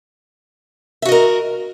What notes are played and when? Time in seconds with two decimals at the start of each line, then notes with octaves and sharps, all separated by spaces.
1.02 E5
1.05 F#4
1.09 D#5
1.12 A#4